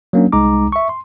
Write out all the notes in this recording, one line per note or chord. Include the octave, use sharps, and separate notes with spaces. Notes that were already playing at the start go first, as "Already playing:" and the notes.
F#3 A#3 C#4 D4
C2 G#3 D#4 A#5 D6
E5 C#6
C6